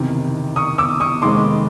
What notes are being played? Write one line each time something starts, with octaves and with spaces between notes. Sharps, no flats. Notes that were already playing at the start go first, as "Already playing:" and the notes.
Already playing: F#1 E2 C3 D#3
C#6 D#6
D6 E6
C#6 D#6
F1 D#2 D#3 G#3 C4 C6 D6